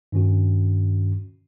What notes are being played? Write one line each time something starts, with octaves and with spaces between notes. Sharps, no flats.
G2 D#3 C#4 F#4